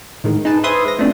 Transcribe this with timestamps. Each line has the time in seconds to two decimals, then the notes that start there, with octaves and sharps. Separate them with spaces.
0.24 A2 D#3 G#3
0.45 D#4 G#4 B4 A5
0.64 B4 C5 E5 C6 D#6 G#6
0.85 G#3 A#6
0.98 F3 A3 C4 D4